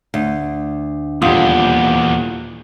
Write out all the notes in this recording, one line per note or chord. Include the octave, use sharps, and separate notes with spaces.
D2
D#1 E2 A#2 F4 G4 F#5 D#6